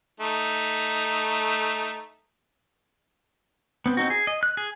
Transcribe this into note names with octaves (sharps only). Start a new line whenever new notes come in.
A3 D#4
B3 C4
C4 D#4 F#4
G#4
D#5
F#6
G#4